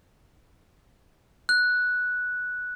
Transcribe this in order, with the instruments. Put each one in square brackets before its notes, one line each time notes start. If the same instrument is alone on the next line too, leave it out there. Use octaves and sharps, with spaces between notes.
[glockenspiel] F#6